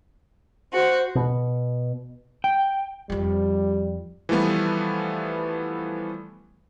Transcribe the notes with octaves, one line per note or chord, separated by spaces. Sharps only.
F#4 C5
B2
G5
F2 F3 G3
E3 F3 G3 A3 B3